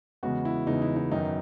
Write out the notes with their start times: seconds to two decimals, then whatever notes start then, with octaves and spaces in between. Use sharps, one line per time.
0.23 E2 C#3 G#3 B3 F#4
0.45 E4
0.67 E2 C#3 G#3 B3 D#4
0.82 E4
0.96 D#4
1.11 F#2 D#3 F#3 B3 D#4